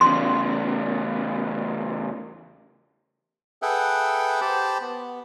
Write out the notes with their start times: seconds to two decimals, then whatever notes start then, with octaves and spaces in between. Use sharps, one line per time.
0.01 E2 C#3 C6
3.62 G#4 A4 B4 E5 F#5 G5
4.41 G4 C5 A5 B5
4.81 B3